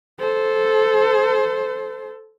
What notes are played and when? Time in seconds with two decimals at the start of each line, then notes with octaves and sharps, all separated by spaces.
0.20 A4 C5